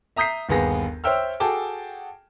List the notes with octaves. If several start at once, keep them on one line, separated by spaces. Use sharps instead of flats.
E5 A#5 D#6 G6 B6 C7
G1 D#2 B3 G#4 A#6
C5 C#5 E5 G5 E6 F6
F#4 G#4 A4 G5 A5 D6